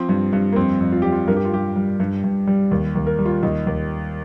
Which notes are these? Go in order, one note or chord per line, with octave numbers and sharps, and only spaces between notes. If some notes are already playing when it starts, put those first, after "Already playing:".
Already playing: F3 C4
G2
G2
A#3
F2 C4
F2
F4
G3 G4
F4
G2 A#4
G4
F4
G2 G4
G3
G2
G2
G3
D#2
D#2
A#4
G3
F4
D#2 D#4
D#2